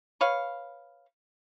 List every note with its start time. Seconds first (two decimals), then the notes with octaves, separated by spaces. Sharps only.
0.21 B4 C#5 F5